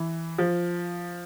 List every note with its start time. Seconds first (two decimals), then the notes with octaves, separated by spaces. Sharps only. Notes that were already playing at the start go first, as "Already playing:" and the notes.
Already playing: E3
0.38 F3